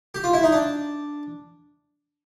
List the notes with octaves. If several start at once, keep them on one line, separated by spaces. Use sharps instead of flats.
G4
F4
E4
D#4
D4